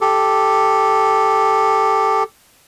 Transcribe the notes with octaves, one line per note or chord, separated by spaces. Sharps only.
G4 A4